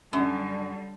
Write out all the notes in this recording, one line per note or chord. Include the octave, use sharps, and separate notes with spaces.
F#2 D3 G3